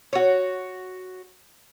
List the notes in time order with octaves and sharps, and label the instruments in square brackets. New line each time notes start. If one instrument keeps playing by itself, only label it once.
[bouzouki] F#4 C#5